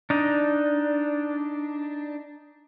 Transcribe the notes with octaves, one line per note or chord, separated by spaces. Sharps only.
D4 D#4